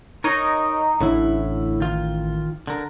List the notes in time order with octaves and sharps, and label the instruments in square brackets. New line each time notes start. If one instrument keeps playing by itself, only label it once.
[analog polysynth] D#4 [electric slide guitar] A#4 C#5
[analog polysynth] A1 [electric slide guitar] A2 D3 E4
[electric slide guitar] D#3 F4
D3 A#4